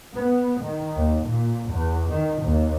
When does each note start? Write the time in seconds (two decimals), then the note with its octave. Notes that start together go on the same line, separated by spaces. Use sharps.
0.14 B3
0.63 D#3
0.98 D#2
1.28 A#2
1.72 E2
2.11 D#3
2.44 D#2